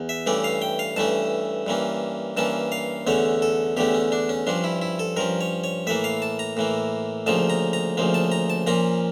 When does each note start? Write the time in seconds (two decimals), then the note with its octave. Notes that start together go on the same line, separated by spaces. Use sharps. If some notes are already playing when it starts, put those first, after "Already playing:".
Already playing: E2
0.09 E5
0.27 G2 E3 A3 C#4 D5
0.44 F5
0.62 G5
0.79 F5
0.97 G2 E3 A3 C#4 A5
1.67 G2 E3 A#3 C#4
2.37 G2 E3 A#3 C#4 A5
2.72 F5
3.07 E2 D3 A3 C#4 C#5
3.42 A4
3.77 E2 D3 A3 C#4 G4
3.94 C#4
4.12 D4
4.29 C#4
4.47 G2 F3 C#4 D4
4.64 E4
4.82 E4
4.99 A4
5.16 G2 F3 C#4 A#4
5.41 C#5
5.64 C#5
5.87 A2 E3 A#3 E5
6.04 F5
6.22 A5
6.39 A#5
6.57 A2 E3 A#3
7.26 D2 C#3 F3 A#3 A5
7.50 A#5
7.73 A#5
7.97 D2 C#3 F3 A#3
8.14 A5
8.32 A#5
8.50 A5
8.67 A#2 F3 A#3 C#4 A#5